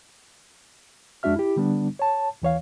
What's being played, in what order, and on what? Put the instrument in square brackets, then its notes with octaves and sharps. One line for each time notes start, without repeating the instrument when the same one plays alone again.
[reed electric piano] F2 G#3 D4 F#4 E5 F6
E4 G4
D3 G3 B3 D4
C#5 A5
D#2 E3 C#5 F5